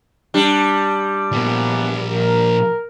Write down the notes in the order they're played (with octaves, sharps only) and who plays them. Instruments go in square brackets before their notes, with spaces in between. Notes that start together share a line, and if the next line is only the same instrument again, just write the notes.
[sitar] G3 D4
[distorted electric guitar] A#2 F3 [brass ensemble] E3 A#3 B3
[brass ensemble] A#4